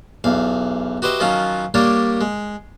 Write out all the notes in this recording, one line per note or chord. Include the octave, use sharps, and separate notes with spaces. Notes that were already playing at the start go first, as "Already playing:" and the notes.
B1 E2 F5
F#4 G4 B4 C5 D#5 E5
D#3 F3 F#3 C#4 F4 F#4
G3 A#3 D4 G4 A#4 C#5
G#3